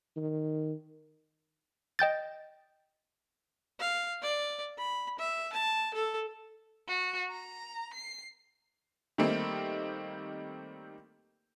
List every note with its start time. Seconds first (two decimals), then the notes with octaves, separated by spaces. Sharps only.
0.17 D#3
1.99 D#5 G5 G6 A6
3.79 F5
4.22 D5
4.78 B5
5.19 E5
5.53 A5
5.94 A4
6.88 F#4
7.31 A#5
7.94 C7
9.18 D#3 G3 A3 A#3 C4 D#4